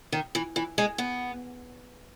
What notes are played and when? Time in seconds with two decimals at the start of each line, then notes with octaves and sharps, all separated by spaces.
0.12 D#3
0.35 E3
0.56 E3
0.78 G#3
0.98 B3